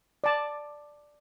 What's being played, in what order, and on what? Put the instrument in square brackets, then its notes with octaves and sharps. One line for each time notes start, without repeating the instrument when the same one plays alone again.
[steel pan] D5 A5